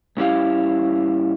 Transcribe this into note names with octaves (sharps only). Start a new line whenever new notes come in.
G2 C#4 E4 G4 F5